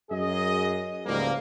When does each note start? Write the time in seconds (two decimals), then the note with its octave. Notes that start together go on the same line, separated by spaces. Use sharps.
0.11 F#2 G#4 D#5
1.06 C#2 G#2 F3 G3 A3 A#3